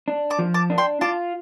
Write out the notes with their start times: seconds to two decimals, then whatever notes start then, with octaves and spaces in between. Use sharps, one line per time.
0.08 D4
0.30 A5 D6
0.39 F3
0.54 A5 D6
0.70 D4
0.78 G5 C6
1.01 F4 A5 D6